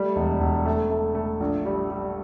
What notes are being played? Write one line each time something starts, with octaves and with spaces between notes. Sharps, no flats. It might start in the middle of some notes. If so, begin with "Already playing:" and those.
Already playing: G3 A3
E1
E1
A3
A3
A3
A#1
G3
G3